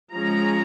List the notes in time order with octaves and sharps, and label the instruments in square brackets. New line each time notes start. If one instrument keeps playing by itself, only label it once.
[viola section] F3 G#3 C#4 A#5